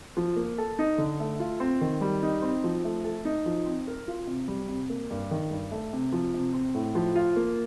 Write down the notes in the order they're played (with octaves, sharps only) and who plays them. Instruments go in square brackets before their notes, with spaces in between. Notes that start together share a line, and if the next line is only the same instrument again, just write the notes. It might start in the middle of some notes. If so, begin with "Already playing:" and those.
[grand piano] F3
A#3
A4
D#4
D3
A3
F4
C4
D#3
G3
D#4
C4
F3
A3
A4
D#4
F3
C4
A#4
F4
C3
G3
C3
A#3
G2
D#3
G2
A3
C3
F3
C3
C4
A2
F3
F4
A#3